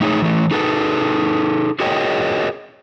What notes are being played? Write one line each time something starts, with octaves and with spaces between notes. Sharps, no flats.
A3 D#4 G#4 C#5
E3 A3
D#4 G#4 A4 B4
F#4 G#4 A#4 C#5 D#5 G5